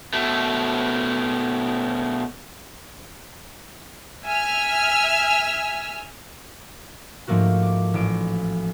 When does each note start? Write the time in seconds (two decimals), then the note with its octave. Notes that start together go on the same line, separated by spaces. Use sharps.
0.13 B2 A3
4.25 E5 G#5 E6 F6
7.28 G#2 F3 A3 A#3 F#4
7.63 D6
7.94 A1 D7